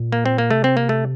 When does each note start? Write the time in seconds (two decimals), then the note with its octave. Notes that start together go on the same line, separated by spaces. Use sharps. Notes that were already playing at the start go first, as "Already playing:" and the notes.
Already playing: A#2
0.12 A#3
0.26 C4
0.38 A#3
0.51 C3 A3
0.64 C4
0.77 A#3
0.89 A3